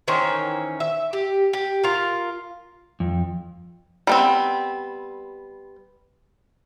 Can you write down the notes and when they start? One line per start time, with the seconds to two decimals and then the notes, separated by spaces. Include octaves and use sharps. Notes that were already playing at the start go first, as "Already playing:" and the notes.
0.08 D#3 E3 C#4 C5
0.80 E5
1.13 G4
1.53 G4
1.83 F4 A#4
3.00 F2
4.07 G3 B3 C4